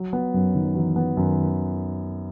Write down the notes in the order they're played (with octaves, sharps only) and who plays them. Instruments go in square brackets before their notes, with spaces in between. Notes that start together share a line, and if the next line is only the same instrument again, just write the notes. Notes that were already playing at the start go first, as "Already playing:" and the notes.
Already playing: [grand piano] F#3
B3
[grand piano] F#2 [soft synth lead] F#3
[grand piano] D#3
[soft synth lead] F#3
[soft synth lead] E3 [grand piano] F#3
[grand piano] B3
[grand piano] F#2 [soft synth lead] D#3